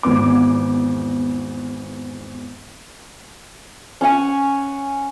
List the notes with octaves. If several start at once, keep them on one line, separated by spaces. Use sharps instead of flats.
G#1 E2 B3 D6
C#4 C#5 F#5 G#5